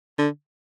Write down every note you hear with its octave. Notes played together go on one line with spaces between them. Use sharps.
D3